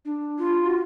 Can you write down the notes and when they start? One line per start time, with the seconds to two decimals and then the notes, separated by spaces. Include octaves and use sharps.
0.05 D4
0.39 F4
0.64 F#4